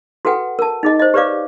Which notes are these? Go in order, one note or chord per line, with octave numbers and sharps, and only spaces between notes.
F#4 A4 B4 F#5 G5
A#4 A5
D#4 G#4 D#5
C5 D#5
G4 B4 C#5 D5 F5 D6